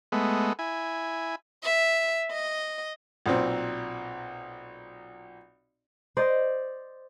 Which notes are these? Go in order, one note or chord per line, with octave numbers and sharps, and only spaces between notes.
G#3 A3 B3
E4 G#5
E5
D#5
B1 A#2 C4
C5 D5 D#5